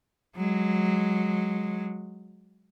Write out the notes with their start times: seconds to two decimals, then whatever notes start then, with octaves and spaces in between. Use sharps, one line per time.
0.37 F#3 G#3